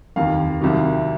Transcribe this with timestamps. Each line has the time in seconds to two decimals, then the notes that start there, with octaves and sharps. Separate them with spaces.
0.16 F1 D#2 D#3 F5
0.61 C2 C3 D#3 F#3